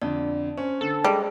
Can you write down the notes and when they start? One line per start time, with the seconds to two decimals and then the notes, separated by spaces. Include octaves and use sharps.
0.02 F2 D3 D5
0.58 C#4 C5
0.81 D3 A4
1.04 G3 G#3 G#4